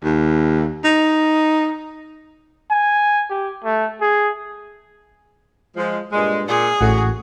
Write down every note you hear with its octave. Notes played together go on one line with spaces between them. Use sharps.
D#2
D#4
G#5
G4
A3
G#4
F3 G#3
G2 A#2 G#3
A#2 G#4
A1 A2 F#4